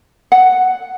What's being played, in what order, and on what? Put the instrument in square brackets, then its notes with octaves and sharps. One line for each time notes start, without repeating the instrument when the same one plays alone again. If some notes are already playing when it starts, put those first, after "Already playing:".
[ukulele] F#5